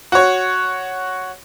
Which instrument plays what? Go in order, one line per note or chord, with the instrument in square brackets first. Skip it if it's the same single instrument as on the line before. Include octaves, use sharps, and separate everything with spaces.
[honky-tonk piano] F#4 C#5